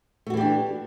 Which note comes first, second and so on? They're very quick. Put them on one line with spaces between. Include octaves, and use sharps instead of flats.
A3 F#4 E3 G4 D4